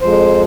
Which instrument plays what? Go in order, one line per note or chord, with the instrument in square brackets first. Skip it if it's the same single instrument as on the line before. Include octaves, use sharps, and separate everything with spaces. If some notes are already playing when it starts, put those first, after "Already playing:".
[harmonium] F2 F3 G#3 C5